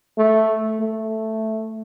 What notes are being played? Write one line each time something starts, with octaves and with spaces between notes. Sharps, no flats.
A3
A3